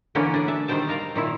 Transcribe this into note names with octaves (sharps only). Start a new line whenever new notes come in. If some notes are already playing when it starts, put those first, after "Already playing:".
D3 E3 A#3 B3 C#4 D4
D4 G#4
E5 A5
D#3 G3 D4 C5 G5 A5
A#4 F5 A#5
A#2 D#3 E4